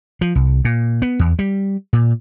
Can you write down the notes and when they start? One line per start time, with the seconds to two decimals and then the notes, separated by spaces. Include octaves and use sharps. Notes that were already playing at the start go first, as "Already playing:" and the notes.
0.21 F3
0.35 C2
0.65 A#2
1.02 B3
1.19 E2
1.39 G3
1.93 A#2